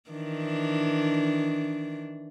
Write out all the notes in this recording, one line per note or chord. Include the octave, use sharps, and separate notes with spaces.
D#3 E3 D4